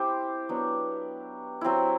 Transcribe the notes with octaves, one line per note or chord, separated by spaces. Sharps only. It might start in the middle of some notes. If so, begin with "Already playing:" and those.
Already playing: C4 E4 G4 C5
F#3 B3 D4
F#3 C4 E4